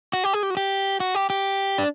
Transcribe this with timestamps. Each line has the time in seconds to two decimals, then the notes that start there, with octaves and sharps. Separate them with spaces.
0.13 F#4
0.24 G4
0.33 G#4
0.43 G4
0.50 F#4
0.57 G4
1.00 F#4
1.15 G4
1.30 G4
1.78 D4